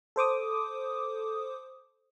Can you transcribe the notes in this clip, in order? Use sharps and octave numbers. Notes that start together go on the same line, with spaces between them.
A4 C5 D6 D#6